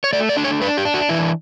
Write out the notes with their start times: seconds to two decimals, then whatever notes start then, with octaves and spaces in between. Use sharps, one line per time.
0.04 C#5
0.13 A3 D5
0.29 D5
0.37 D4
0.44 C#5
0.62 D4 B4
0.77 G4
0.85 D4
0.94 F#4
1.09 E3 E4